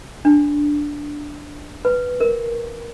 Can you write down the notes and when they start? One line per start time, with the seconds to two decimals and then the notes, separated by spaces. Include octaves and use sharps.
0.25 D4
1.85 B4
2.20 A#4